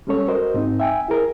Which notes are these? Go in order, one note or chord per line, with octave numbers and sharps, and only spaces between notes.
G3 G#3 C#4 A4 C#5
F#4 A#4 C5 D#5
G#2 C4 D#4
E5 G5 G#5
E4 G#4 A#4